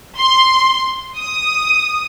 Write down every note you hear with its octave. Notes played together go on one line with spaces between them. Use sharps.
C6
D#6